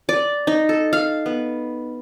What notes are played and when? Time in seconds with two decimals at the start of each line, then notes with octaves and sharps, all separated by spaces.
0.09 D5
0.47 D#4
0.69 A4
0.93 F5
1.26 B3